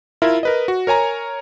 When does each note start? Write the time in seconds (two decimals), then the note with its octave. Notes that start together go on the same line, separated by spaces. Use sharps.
0.22 E4 F4 A#4 E5
0.43 A#4 B4 D#5
0.68 F#4
0.87 A#4 C#5 G#5 A#5